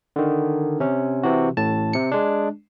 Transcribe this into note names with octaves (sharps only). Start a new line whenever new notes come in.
D3 D#3
C3 C#4
C3 E3 F#4
A1 A2 A5
C3 C#7
G#3 D4